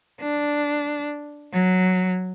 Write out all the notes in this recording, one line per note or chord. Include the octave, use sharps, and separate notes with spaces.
D4
F#3